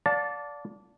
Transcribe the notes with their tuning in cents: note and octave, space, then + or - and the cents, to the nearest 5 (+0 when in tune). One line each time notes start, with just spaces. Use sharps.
D5 -15 F5 +40 A5 +0